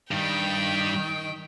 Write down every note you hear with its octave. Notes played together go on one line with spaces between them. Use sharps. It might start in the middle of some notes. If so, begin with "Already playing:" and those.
G2 D#3 G3 G5